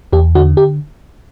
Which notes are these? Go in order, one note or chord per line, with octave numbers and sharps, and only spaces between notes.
E2 G4
D3 F#4
G4